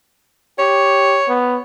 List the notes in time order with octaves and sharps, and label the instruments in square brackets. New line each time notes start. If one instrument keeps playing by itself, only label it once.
[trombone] G4 [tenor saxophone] C#5
[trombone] B3